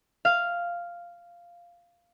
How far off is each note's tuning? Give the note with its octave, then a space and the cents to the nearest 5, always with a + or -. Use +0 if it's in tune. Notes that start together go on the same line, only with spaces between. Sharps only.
F5 -5